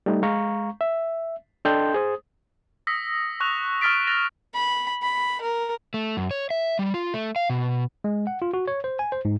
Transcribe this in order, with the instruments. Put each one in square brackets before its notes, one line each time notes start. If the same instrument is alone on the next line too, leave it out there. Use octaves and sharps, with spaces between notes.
[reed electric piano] G3 A3 D#4
G#3 F5 A#5 C#6
E5
D4 A4 D#5 G5 C6 G6
G#4 C5 D#6
[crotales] D#6 E6 A#6 B6 C#7
C#6 F#6 F7
C#6 E6 F6 A6 B6 D7
F#6 A6 A#6 F7
[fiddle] B5
B5
A#4
[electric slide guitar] A3
F#2
C#5
E5
G3
F4
A3
F5
B2
[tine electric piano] G#3
F#5
F4
F#4
C#5
C5
G#5
C5
G#2